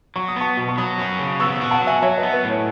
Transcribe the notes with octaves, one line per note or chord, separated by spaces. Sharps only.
F#3 C#6
D#6
B3 A5 C#6
B2
C#6
F#3 B5 D#6
C#4
C#3
B3 C#6 E6
F#4
F#5 A5
F#3
E5 G#5
F#3 C#5 E5
B4 D#5
B3
B4
A2
C#5